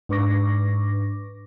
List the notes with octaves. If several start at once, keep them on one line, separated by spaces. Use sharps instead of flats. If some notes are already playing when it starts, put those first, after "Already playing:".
G#2 D4 B4 C#6 D6 A#6